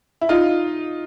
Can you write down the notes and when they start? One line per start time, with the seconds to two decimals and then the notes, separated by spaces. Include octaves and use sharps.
0.21 E4
0.29 D#4 F4